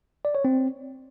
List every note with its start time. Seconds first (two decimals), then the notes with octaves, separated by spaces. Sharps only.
0.25 D5
0.35 C#5
0.45 C4